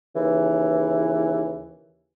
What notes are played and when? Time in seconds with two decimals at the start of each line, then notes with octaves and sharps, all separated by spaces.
0.15 D#2 C#3 E3